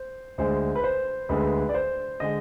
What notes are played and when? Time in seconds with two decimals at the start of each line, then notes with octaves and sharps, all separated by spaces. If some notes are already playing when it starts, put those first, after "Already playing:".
Already playing: C5
0.38 D2 D3 G#3 C5
0.75 B4
0.84 C5
1.29 D2 D3 G#3 B4
1.69 D5
1.74 C5
2.20 D3 G#3 D#5